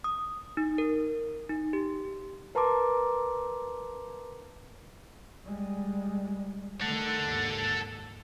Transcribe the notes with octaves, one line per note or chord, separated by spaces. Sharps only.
D#6
D#4
A#4
D#4
G4
A#4 B4 A5 A#5 C6 D6
G3 G#3
D#3 A3 A4 F#5
D#2 G#2